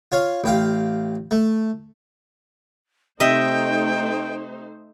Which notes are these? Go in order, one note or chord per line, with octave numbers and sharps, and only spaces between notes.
F4 C#5 F5
A1 G4 F5
A3
C3 A3 D#4 C5 D#5 E5 G5